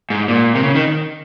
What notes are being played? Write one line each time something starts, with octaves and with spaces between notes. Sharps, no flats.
G#2
A#2
C3
C#3
D#3